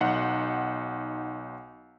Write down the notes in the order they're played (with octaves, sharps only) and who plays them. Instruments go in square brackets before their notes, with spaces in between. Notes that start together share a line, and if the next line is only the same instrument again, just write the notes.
[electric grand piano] B1 D#4 F#5